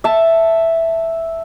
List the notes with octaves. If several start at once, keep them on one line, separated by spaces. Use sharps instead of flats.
E5 A5